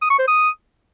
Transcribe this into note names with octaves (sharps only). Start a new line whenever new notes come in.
D#6
C#6
C5
D#6